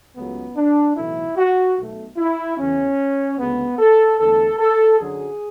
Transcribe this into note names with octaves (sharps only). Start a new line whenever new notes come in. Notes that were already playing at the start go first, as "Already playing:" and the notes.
C#2 C#3 F#3 A3 B3
D4
B1 A2 E3 A3 E4
F#4
B1 B2 A3
E4
E2 C#3 E3 C#4
D2 C#3 G#3 B3
A4
E2 D3 A3 A4
A4
F#2 D3 F#3 G#4